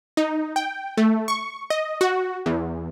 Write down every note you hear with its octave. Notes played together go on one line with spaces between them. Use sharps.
D#4
G5
A3
C#6
D#5
F#4
E2